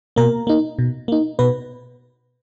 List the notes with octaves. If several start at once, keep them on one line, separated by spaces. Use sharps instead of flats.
B2 A#3 A#4
A#3 D#4
B2
A#3 D#4
B2 B3 B4